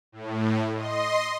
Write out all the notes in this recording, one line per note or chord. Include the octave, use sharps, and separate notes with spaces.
A2
D#5 C6